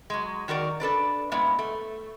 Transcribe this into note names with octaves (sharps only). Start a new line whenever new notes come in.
F#3 G#3
D#3 F#4 A#4 D5
D4 A4 B4 D5
A#2 G#3 B3 E4
A3